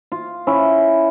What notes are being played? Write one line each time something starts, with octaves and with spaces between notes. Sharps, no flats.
F4
C#4 E4